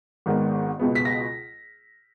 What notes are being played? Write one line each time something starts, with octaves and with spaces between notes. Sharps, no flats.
G#1 G#2 D#3 G#3 B3
C#2 B2 G#3 B3
B6
A#6